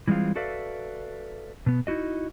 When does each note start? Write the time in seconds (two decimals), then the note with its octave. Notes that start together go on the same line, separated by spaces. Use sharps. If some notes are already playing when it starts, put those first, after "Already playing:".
0.08 E3 G3 G#3 C4 F4
0.36 F#4 A4 B4 D5 E5 F5
1.66 B2 B3
1.87 D#4 E4 F#4 D#5